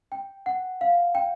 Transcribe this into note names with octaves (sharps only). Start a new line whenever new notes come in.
G5
F#5
F5
G5